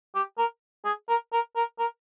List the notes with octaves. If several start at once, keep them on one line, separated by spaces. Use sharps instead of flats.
G4
A#4
G#4
A#4
A#4
A#4
A#4